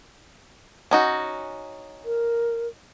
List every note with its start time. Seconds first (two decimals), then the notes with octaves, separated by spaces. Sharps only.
0.91 C#4 D#4 F#4
2.05 A#4